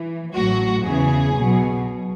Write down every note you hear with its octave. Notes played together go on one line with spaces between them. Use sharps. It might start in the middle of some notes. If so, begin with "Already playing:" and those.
Already playing: E3
A1 A2 F#3 F#4
E2 C#3 E3 G#4
B1 B2 F#3